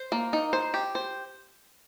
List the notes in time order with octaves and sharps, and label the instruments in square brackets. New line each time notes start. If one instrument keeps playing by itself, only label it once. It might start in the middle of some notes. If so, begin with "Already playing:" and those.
Already playing: [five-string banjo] C5
A#3
D#4
C5
G4
C5